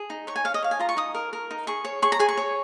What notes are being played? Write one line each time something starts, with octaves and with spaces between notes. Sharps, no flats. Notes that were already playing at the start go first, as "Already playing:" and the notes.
Already playing: G#4
D#4
C#5 C#6
G#5
C#5 F5
D#5
C#5 F5
G#5
F4 A#5
C#6
D#4 D#6
A#4
A#4
D#4
G#4 C#6
C#5
G#4 C#6
A#5
G#4 G#5
C#6
C#5